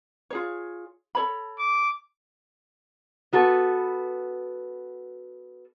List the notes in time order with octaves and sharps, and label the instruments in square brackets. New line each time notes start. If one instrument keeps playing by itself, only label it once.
[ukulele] F4 G#4 C#5
A4 C#5 B5
[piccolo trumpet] D6
[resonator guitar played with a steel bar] B3 F#4 A4 B4